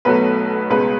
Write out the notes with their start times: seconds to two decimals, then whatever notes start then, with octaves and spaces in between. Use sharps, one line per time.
0.05 B1 B2 F#3 A3 B4
0.70 C#2 B2 G#3 B4